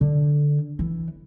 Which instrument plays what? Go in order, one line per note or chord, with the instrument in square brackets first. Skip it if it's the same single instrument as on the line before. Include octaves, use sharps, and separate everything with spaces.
[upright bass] D3
E3